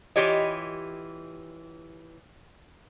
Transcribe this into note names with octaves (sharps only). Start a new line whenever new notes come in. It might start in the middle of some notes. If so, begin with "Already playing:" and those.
E3 F4 G4 C#5 D#5